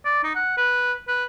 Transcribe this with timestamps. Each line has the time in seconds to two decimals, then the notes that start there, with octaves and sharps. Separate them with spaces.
0.05 D5
0.24 D#4
0.35 F#5
0.57 B4
1.08 B4